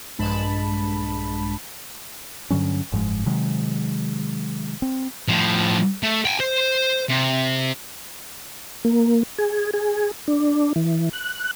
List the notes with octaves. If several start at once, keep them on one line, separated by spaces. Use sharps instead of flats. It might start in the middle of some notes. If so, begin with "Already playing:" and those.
A#1 G2 G#3 A5 B5
G2 D3 F#3 C#4
F#1 G#2 F3 G#3
C3 D#3 F#3 G#3
C4
A2 F3
A3
G5 G#5
C5
C3
A#3
G#4
G#4
D4
E3
F#6